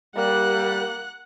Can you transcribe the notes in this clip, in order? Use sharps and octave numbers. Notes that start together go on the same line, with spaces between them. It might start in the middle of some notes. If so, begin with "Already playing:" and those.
G3 A#3 F#5 F#6